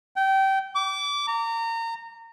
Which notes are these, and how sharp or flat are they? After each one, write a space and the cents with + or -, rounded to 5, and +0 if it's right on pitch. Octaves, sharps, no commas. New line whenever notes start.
G5 -25
D6 -25
A#5 -30